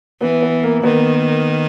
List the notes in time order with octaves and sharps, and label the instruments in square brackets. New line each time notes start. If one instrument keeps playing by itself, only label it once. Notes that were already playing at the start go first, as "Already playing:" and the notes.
[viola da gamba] E3 [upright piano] B3
[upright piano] B3
A#3
[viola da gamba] D#3 [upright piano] B3